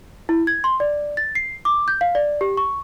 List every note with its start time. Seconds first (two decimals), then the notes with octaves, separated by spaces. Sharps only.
0.29 E4
0.47 G#6
0.64 C6
0.80 D5
1.17 A6
1.35 C7
1.65 D6
1.88 G6
2.01 F5
2.15 D5
2.41 G4
2.57 C#6